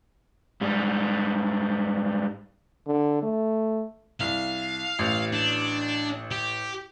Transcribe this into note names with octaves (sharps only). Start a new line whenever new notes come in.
G#2 G3
D3
A3
C2 F5
A1
D4
G4